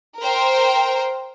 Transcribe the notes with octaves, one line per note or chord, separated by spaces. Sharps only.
A#4 C5 G5